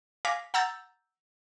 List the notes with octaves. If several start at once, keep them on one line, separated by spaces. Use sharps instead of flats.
F5 G#5 D6 A#6 B6
F#5 A#5 E6 G6 A6